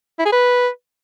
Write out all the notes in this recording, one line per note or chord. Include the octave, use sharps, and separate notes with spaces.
E4
G#4
B4